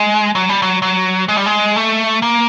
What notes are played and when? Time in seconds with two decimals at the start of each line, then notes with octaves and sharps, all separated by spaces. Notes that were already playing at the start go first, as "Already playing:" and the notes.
Already playing: G#3
0.35 F#3
0.49 G3
0.62 F#3
0.82 F#3
1.28 G#3
1.37 G3
1.46 G#3
1.76 A3
2.22 A#3